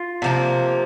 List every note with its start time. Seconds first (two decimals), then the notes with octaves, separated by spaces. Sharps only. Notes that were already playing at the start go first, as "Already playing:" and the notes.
Already playing: F4
0.22 C3 F3 A#3